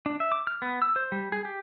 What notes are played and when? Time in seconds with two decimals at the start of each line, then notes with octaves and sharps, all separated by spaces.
0.06 D4
0.20 E5
0.32 D6
0.47 F6
0.62 B3
0.82 E6
0.96 C5
1.12 G3
1.32 G#4
1.45 G4